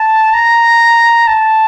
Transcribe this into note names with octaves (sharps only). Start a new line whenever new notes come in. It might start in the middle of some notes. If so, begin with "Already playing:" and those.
Already playing: A5
A#5
A5